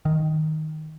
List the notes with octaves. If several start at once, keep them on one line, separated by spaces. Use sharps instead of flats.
D#3